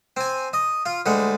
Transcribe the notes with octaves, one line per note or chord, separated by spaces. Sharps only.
C4 G#5
D#5
F4
D2 G3 G#3 F#5